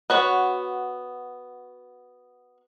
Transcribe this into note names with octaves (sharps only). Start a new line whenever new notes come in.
B3 F#4 C#5